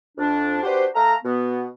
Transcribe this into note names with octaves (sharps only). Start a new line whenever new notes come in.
F2 D4
D4 F#4 G4 B4 C5
A3 A4 F5 A#5
B2 B3